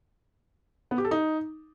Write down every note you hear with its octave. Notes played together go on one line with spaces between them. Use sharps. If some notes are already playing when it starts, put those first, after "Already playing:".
B3
G4
A4
D#4